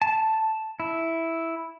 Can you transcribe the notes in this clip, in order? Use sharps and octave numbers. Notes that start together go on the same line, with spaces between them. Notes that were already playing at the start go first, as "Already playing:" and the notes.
A5
E4